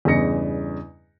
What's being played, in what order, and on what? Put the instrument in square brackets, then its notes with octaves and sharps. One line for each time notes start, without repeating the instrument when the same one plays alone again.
[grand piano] E2 G2 C#3 D#5 A#6 C#7